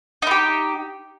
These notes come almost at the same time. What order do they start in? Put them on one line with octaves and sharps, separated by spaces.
D#4 E4 G4